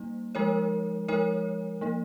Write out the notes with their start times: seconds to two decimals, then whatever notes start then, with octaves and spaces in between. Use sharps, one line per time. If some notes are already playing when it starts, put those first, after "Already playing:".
Already playing: G3 A#3 D#4
0.35 F3 G#3 D#4 A#4 C#5
1.08 F3 G#3 D#4 A#4 C#5
1.81 F3 A#3 D#4